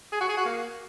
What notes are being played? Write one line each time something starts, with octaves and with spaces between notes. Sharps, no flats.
G#4
F#4
G#4
F#4
A#3